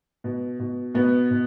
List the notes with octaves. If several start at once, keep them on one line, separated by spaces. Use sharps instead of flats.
B2
B2
B2 B3
B2